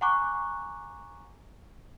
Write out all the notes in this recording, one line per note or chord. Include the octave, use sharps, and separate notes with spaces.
F#5 G#5 A#5 C#6 D6 F#6